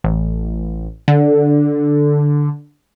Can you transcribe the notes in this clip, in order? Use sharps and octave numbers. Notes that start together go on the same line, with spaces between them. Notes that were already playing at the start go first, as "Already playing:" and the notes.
A1
D3